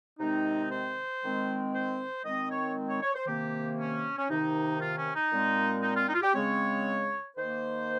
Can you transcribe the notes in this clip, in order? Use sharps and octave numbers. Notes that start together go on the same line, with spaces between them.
C3 D#3 G#3 C4 D#4
C5
D#3 G#3 C4
C5
D#3 G#3 C4 D#5
C#5
C#5
C#5
C5
C3 D#3 A#3 G4
C#4
C#4
C3 D#3 A#3 D#4
F4
C#4
D#4
A#2 G#3 C4
D#4
F4
D#4
F4
G4
C#3 G#3 C4 C#5
D#3 A#3 C5